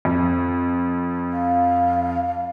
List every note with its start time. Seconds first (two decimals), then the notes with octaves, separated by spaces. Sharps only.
0.05 F2
1.32 F5